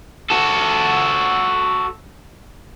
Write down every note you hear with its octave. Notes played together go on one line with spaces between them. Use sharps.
F#4 A4